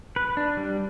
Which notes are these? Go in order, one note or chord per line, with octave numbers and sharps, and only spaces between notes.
B4
D4
G3